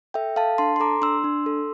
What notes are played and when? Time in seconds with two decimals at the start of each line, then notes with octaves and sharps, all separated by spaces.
0.14 A4 E5 G5
0.36 A4 F5 A5
0.58 D4 A5 C6
0.76 C6
0.80 A4 A#5 D6
1.02 D4 C6 E6
1.24 D4
1.46 A4